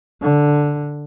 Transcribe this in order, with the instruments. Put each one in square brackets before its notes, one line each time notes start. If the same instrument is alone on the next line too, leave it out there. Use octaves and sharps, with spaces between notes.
[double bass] D3